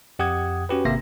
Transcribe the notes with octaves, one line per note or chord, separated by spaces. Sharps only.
F2 G4 F#5 D#6 G#6
C#4 F#4 G4 B4
G#1 C3 A#3 E5 A#6